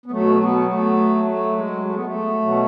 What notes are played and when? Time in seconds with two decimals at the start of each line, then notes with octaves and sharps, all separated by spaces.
0.06 B3
0.11 B2 F#3 A3
0.40 B2 B3
0.69 A3
1.27 A3
1.56 G#3
1.84 A3
1.94 B3
2.05 A3
2.42 B2 F#3